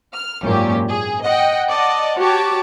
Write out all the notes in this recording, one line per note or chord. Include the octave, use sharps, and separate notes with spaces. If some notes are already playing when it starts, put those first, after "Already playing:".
F6
G#1 F#2 A#2 C#4 G4
G#4
D#5 F#5 G5
D5 D#5 F#5 A5
F#4 G4 C#5 A5 D6